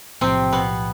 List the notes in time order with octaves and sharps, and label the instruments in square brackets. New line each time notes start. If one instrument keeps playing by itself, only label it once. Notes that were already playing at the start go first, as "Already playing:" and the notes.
[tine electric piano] B1 A2 F3 [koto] C3 C4
[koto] B2 B3